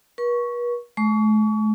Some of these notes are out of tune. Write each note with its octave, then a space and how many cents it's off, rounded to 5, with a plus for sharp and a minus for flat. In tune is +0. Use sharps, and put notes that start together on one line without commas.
B4 -45 C#6 +5
A3 -45 C#6 +35